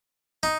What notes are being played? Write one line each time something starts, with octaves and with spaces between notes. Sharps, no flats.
D#4